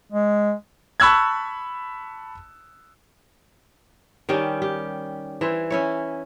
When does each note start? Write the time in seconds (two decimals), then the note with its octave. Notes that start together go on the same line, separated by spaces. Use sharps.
0.12 G#3
1.00 A5 B5 C#6 E6 F#6 G#6
4.29 D#3 G3 C#4 G4
4.62 G4
5.41 E3 E4 C5
5.70 C#4 E4 C#5